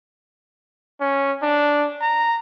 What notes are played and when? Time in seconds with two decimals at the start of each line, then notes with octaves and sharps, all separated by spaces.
1.01 C#4
1.42 D4
2.01 A#5